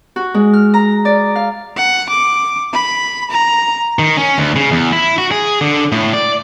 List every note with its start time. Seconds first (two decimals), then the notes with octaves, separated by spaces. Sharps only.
0.16 F#4
0.34 G#3
0.53 F6
0.74 A#5
1.05 D5
1.36 F5
1.77 F#5
2.09 D6
2.73 B5
3.30 A#5
3.99 D#3
4.17 C#4
4.38 D2
4.56 C#3
4.71 E2
4.93 E4
5.18 F#4
5.31 G#4
5.61 D3
5.92 A2
6.14 D5